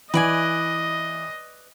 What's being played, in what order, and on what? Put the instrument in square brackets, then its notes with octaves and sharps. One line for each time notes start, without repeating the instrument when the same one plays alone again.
[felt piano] E3 [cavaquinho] B4 D5 G#5 [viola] D#5